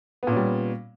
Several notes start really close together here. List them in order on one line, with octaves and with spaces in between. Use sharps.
B3 A#2 C#4 G3